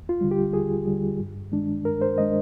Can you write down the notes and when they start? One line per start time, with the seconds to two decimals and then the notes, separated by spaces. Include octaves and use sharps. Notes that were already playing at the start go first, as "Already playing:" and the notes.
Already playing: D#2
0.09 F4
0.21 D3 G3
0.31 G4
0.53 D#2 G#4
0.87 D3 G3
1.20 G2
1.52 D#3 G#3 D4
1.85 G2 A#4
2.02 C5
2.18 D#3 G#3 D4 D#5